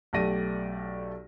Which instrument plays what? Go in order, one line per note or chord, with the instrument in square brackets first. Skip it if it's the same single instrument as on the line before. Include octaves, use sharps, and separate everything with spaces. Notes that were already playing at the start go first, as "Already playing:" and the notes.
[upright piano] B1 A3 G4 D5 A#6 D#7